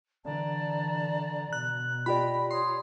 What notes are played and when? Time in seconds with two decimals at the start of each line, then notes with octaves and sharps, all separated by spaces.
0.25 D3 E3 D5 A5 A#5
1.53 B2 F#6
2.06 F4 G4 D5 D#5 B5
2.51 C#5 C6 D#6